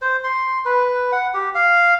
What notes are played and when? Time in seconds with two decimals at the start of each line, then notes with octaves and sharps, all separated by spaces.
0.02 C5
0.24 C6
0.65 B4
1.12 F#5
1.34 G4
1.55 F5